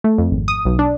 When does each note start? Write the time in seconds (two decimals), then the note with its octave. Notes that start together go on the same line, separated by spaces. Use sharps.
0.04 A3
0.18 F2
0.31 G#1
0.48 D#6
0.65 B1
0.79 D4